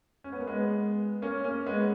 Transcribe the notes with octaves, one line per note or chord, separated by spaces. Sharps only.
C#4
B3
A#3
G#3 B3
A#3 C#4
A#3 C#4
G#3 B3